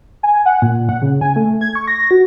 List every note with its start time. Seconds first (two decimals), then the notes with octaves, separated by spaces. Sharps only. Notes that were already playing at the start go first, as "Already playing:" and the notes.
0.23 G#5
0.46 F#5
0.62 A#2
0.89 F#5
1.02 C#3
1.21 G#5
1.36 A3
1.61 G#6
1.75 C#6
1.87 A#6
2.11 F#4